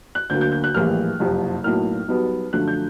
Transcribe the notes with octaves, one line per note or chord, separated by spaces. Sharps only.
F#6
D2 D3 F#3 A#3 G6
G6
G6
F#6
A#1 A2 E3 G3 A#3 F6
F#1 F2 C3 F3
B1 A2 F#3 A#3 F6
B1 B2 G3 B3
F#2 D3 F3 A3 F#6
G6